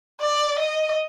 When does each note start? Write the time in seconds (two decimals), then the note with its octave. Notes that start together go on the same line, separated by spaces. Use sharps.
0.21 D5
0.59 D#5